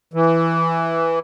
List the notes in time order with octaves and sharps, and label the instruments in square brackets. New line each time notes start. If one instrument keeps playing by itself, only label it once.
[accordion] E3